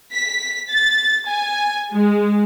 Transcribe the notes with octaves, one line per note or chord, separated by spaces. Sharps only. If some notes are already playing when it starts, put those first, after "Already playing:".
B6
A6
G#5
G#3